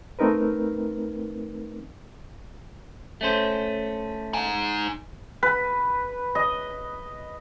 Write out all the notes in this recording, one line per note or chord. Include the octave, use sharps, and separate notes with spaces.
A3 C4 D#4 A#4 B4
A3 C#4 C5
D#4 G#5
B4
D#5